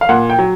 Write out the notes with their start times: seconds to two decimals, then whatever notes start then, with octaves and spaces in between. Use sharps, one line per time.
0.01 F5
0.09 A#2 F#5
0.30 G5
0.39 F#3